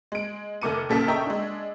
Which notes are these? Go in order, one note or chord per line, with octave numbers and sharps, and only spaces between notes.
G#3 D7
F1 D#3 A3 D6 C#7 D#7
A#1 A#2 C#3 A4 A#4 B6
D#5 E5 G5 A#5 C#6 E6
G#3 D4